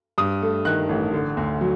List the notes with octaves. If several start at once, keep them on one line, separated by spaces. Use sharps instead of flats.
G2 D#6
A3
D#3 F#6
A1
D3
D2
F#3